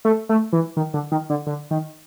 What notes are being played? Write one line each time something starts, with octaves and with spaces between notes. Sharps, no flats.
A3
A3
E3
D#3
D3
D#3
D3
D3
D#3